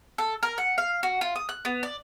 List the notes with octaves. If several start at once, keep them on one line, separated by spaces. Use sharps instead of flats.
A4
A#4
F#5
F5
F#4
F4
D#6
F#6
B3
D5